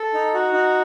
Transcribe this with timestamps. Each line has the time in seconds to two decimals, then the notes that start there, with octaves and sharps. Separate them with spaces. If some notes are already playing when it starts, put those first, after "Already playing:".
Already playing: A4
0.14 D#4
0.34 F#4
0.53 D#4